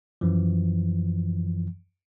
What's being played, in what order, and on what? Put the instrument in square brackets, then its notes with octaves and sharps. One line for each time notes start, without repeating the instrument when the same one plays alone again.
[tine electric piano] F#2 E3 F3